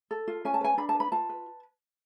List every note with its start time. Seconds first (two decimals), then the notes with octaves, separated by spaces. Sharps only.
0.11 A4
0.28 F4
0.45 C#4 G#5
0.54 A5
0.61 B4 G#5
0.77 D4 B5
0.89 A5
0.95 B4
1.00 B5
1.12 F4 A5
1.29 B4